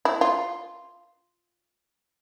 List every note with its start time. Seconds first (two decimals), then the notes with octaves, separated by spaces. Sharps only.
0.05 E4
0.21 F4